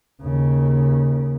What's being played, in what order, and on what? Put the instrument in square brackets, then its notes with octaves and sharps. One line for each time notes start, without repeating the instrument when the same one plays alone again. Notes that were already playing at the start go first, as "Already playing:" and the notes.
[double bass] D#2 C#3